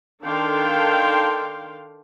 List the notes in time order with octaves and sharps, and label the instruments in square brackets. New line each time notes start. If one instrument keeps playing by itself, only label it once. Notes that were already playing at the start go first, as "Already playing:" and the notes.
[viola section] D#3 D4 A4 F5 G5 C6